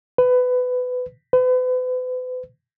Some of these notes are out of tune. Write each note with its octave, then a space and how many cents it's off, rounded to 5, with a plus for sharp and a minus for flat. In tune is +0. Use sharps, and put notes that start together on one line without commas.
B4 +20
B4 +40